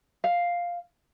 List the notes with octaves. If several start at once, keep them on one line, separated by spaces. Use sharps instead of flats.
F5